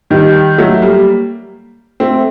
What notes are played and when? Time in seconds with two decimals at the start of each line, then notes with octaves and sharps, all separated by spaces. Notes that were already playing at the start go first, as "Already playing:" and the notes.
0.10 D#3 G3
0.58 F#3 A3
0.82 G3 A#3
2.00 A3 C4